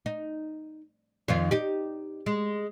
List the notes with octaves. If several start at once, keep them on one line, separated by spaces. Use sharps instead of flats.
D#4
F2 D#3 F4
D#4 G4
G#3